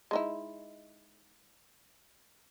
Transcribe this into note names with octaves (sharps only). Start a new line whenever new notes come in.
G#3 D#4 E4